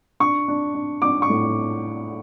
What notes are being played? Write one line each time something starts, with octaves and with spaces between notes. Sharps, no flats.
D4 C#6
D4
D4
D4 D6
C#6
A2